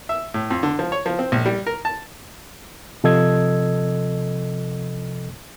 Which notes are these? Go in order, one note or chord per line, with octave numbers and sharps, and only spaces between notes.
E5
A2
F2
D3
F3
C#5
F3
C4
A#1
G3
A#4
A5
C3 F3 A4 D#5 E6 G#6